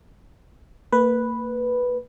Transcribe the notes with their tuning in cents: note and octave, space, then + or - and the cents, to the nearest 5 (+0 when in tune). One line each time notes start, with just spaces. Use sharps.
A#3 -30 B4 +0